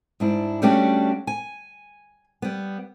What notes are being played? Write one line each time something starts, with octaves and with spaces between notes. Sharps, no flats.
G#2 D4 E4
G3 A3 C#4 D4 F#4 G4
G#5
G3 B3